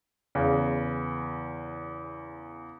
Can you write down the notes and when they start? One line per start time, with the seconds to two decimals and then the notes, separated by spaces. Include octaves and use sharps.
0.35 E2 C#3